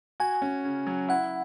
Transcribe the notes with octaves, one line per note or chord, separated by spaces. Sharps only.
F#4 G#5
C#4
C#3
F#3
E4 F#5